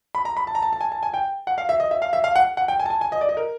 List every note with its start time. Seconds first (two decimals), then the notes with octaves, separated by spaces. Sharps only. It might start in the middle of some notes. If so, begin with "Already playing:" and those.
0.15 B5
0.25 A#5
0.37 B5
0.47 A5
0.55 A#5
0.62 A5
0.73 A5
0.81 G#5
0.92 A5
1.03 G#5
1.14 G5
1.47 F#5
1.58 F5
1.69 E5
1.80 D#5
1.91 E5
2.02 F5
2.13 E5
2.24 F5
2.36 F#5
2.57 F#5
2.68 G5
2.80 G#5
2.86 A5
2.90 G#5
3.01 G#5
3.12 D#5
3.21 D5
3.29 D#5
3.37 A#4